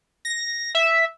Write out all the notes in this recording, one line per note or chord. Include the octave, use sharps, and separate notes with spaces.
A#6
E5